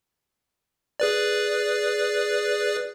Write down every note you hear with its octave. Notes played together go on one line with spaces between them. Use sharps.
G#4 B4 D5